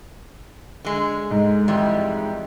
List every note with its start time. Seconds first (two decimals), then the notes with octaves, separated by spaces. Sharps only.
0.85 D3 G#3
1.31 G#2
1.68 F2 E3 G3